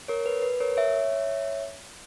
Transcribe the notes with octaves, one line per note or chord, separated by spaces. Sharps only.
A#4 C#5
B4
B4
A#4 C#5
C#5 E5